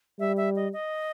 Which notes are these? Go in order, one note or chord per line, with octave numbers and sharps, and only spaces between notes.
G3 E5
E5
D#5
D#5